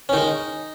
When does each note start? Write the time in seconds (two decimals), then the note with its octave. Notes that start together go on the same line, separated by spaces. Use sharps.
0.09 C#4
0.13 D#3 G#3 D#4